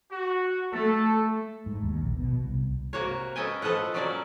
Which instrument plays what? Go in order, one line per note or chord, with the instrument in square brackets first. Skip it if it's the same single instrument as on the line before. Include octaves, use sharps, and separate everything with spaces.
[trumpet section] F#4
[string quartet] A3 [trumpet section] A4
[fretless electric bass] G#2
D#2
A#1
B2
C2
[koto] C3 A#3 F#4 C#5
C#4 A4 B4 D#5 G5 G#5
F3 A4 B4 D#5 F#5
F#3 A#3 C#4 D5